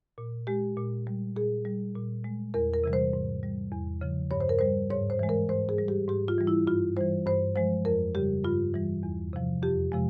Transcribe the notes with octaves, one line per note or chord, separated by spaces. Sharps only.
A#2
G#3 G4
A#2
G3
A#2 G#4
G3
A#2
G#3
E2 A#4
A#4
C3 E3 G3
C5
G#2
G3
E2
C#3 F3
G2 C#5
C5
A#4
G3 C5
G#2 C#5
C5
E3 G#3
A#4
G#2 C5
G#4
G3
G4
G#2 G4
F4
E3 G3
E4
G2 F4
E3 G3 C5
G2 C5
F3 G#3 C5
F2 A#4
C#3 G3 G4
G2 F4
E3 G3
E2
C3 F3
F2 G4
C3 F3 G#3